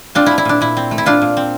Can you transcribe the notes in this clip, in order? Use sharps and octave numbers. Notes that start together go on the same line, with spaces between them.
C4 D4 F4
A3 E4
E4
A#2 D4
A#2 E4
C4
A3
E4
A#2 D4 F4
A#2
C4